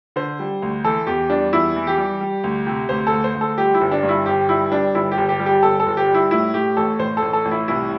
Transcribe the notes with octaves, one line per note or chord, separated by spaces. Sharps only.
D3 C5
G3
D2
E3 A4
E2 G4
G3 D4
E2 E4
E3
G4
G3
G3
D2
C3
D2 C5
A4
D2
C5
D2
A4
G3 G4
E4
G1
D4
G2
E4
G1 G4
G3 E4
G3 D4
G1 E4
G4
G1
G4
G3
G4
G1 A4
A4
G1
G4
G3
E4
A2 E4
A2 G4
A1 A4
A1 C5
A1 A4
A4
A1
E4
C2 E4